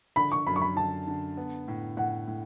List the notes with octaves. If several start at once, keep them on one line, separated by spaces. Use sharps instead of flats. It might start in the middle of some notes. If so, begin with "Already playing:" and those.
D3 B5
C#6
F#2 B5
C#6
B5
D3 A5
D3
B3
A2
A2 F#5
A2